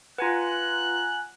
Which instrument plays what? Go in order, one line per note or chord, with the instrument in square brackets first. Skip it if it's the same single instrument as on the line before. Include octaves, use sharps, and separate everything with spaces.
[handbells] F4 B4 [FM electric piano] F#5 G#5 A#5 [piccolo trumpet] F#6